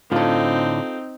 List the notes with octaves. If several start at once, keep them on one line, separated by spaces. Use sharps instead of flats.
A2 D3 C4 D#4 F4 A4